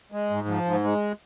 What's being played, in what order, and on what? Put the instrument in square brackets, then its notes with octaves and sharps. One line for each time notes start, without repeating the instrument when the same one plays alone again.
[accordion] G#3
G#2
F3
G#2
G#3